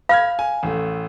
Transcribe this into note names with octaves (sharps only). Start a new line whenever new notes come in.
F5 B5 F6 G#6
G#5
A1 A3